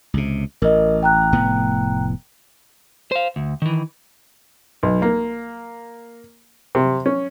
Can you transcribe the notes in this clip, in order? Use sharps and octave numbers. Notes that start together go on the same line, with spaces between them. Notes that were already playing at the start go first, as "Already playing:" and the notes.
C#2 C3
A1 A#4 D#5
G5 A#5 F#6
F1 A2 B3
C5 F5
D2
D#3 E3
B1
A#3
C3
C#4